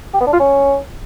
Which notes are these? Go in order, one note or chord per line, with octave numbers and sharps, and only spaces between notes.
G4
B3
D4
F4
C#4